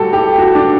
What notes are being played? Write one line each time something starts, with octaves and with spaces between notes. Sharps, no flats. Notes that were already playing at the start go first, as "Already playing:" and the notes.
Already playing: A2 G3 F#4 G4 A4
G4
F#4
D4